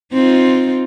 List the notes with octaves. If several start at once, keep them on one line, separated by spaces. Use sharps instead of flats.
C4 D#4 F4